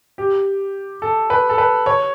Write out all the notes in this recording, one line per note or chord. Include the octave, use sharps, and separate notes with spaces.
G4
A4
B4
A4
B4
C#5